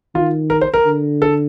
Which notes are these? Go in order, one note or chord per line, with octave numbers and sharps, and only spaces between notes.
D#3 F4
A#4
C5
A#4
D3
A4